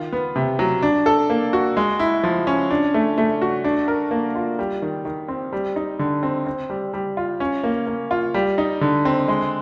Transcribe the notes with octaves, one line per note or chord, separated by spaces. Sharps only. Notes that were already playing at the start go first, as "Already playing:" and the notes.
Already playing: D#3 F4
B3
C3
F#3
D4
A4
A#3
F#4
G#3
E4
F3
C#4
D4
A3
A3
F#4
D4
A#4
A#3
F4
G3
D#3
D#3
C4
G3
D#4
D3
C4
C4
G3
G3
F4
C#4
A#3
A#3
F4
G3
D#4
D3
C4
G#3